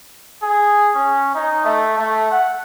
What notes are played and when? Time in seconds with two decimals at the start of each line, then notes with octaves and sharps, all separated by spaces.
0.43 G#4
0.95 C#4
1.35 D#4
1.65 A3
1.98 A3
2.31 F#5